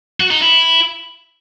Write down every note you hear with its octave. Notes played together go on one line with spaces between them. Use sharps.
F#4
D#4
E4